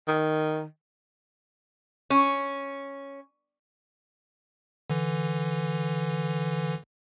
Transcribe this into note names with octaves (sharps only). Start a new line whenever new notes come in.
D#3
C#4
D3 E3